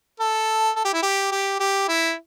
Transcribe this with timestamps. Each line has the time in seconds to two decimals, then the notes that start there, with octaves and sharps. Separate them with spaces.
0.20 A4
0.76 A4
0.85 G4
0.93 E4
1.03 G4
1.32 G4
1.60 G4
1.88 E4